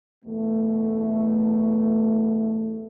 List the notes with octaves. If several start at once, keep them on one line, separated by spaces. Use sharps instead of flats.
F#1 E2 B2 A3